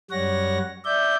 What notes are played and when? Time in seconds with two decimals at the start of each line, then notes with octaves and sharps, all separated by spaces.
0.11 F#2 G3 C#5 F#5 A#6
0.85 D5 E5 G6